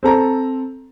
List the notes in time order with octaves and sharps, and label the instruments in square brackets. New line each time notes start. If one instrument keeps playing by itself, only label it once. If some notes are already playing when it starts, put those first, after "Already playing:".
[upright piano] C4 A4 A#5